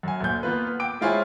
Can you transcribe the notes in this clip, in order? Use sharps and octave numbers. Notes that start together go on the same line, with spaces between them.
F#2 G#5
D2 A#2 G6
A#3 B3 F4 B4
G5 D6 D7
G#3 E4 F4 C5 C#5 G#5